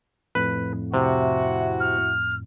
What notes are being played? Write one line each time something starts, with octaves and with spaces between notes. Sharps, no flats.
F2 A2 B4
C3 E4 F#4
F6